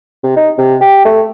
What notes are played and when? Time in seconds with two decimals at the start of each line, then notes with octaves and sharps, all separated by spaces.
0.24 C3
0.36 D#4
0.58 C3
0.81 G4
1.05 A3